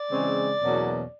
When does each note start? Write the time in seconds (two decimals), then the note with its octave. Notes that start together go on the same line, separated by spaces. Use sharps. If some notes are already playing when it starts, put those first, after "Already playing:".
Already playing: D5
0.11 C#3 E3 G#3 C4
0.62 E2 B2 F#3 A#3 C#4